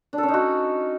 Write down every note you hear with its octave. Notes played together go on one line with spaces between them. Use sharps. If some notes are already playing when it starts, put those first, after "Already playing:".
D4
A4
C#4
D#4
F#4